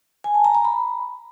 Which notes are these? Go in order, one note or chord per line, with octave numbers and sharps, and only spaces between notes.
G#5
A5
A#5
A#5
B5